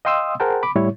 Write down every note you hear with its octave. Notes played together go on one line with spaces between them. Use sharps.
D#5 F5 G5 C6 D#6 E6
G#4 A#4 C5 F#5 G5 A5
B5 D6
A2 G3 E4 C#5